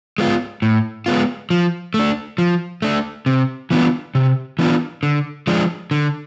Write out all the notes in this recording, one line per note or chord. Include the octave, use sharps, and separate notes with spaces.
G#3 B3 F4
A2
G#3 B3 F4
F3
A3
D4
F3
A3 D4
C3
E3 B3 D4 F4
C3
E3 B3 D4 F4
D3
F3 G#3 D4
D3